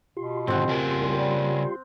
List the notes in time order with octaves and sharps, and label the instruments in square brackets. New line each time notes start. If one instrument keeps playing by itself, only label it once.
[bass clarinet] B2 [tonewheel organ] F4 G4 C6
[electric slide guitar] G#2 D3 D#3 [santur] C4 F#5
[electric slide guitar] C#3 G#4 A#4
[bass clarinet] C2
G3